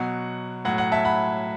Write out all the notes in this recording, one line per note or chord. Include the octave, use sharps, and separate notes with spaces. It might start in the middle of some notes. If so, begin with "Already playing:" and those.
Already playing: B2 F#3 F#5
A2 F#3 F#5
F#5
E5 A5
F#5 B5